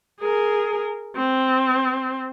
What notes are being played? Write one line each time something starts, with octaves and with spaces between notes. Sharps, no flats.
G#4 A#4
C4